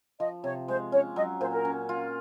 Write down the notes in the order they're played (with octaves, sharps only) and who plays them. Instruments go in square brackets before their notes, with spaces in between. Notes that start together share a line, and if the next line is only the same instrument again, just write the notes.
[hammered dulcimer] F3 [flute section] D#5
[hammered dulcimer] C3 [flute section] C#5
[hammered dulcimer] G#3 [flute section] C5
[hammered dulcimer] C#4 [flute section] C#5
[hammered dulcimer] F#3 [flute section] D#5
[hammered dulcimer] A#2 [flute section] C5
[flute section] A#4
[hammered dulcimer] C#4
F4